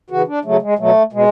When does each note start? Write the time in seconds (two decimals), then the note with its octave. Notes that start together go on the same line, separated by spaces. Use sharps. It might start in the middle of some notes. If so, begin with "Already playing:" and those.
0.10 C#3 E3 F#4
0.27 D4
0.45 C#3 F#3 A3
0.62 G#3
0.79 B2 F#3 A3
1.13 B2 G#3